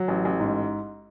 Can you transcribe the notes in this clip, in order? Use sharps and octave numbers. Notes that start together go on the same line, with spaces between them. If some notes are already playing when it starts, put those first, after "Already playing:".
Already playing: F#3
A1
A1
G#2